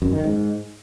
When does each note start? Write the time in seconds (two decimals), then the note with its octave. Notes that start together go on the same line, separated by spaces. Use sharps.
0.02 F#2
0.13 D#3
0.24 G#2